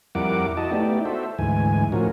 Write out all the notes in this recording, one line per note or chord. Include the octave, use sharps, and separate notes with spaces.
F2 G3 E4 A#4 F#5 D6
E4 F#4 D#5 A5
A3 B3 D#4 E4 G4 D5
F#4 A4 C5 E5
D2 G#2 E3 G#5
A2 F3 C#4 F#4 A#4